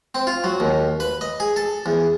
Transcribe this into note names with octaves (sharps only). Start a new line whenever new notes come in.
C4
F4
F#3
D#2
B4
D#5
G#4
A4
E2